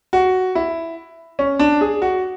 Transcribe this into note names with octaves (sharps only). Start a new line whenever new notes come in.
F#4
E4
C#4
D4
G#4
F#4